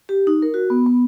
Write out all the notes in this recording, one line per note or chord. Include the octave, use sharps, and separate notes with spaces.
G4
D#4
A#4
F#4
B3
B3